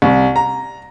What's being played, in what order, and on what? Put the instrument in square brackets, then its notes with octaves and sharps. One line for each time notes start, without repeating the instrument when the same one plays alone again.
[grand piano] C2
A#5